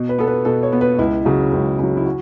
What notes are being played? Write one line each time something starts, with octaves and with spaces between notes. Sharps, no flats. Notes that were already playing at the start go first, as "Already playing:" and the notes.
Already playing: B2
B4
B3 A4
B4
B2 A4
C#5
B3
B4
C#2 E4
C#3 F#3 F#4
C#2
C#3 F#3
E4
F#4